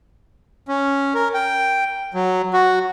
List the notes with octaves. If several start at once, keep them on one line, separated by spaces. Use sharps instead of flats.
C#4
A#4
G5
F#3
F#4